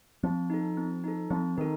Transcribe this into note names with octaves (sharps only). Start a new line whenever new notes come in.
F3 C4
D#4 A4
C4
D#4 A4
F3 C4
D#3 D#4 A4